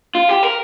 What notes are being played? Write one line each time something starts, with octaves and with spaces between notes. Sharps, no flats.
F4
G4
A#4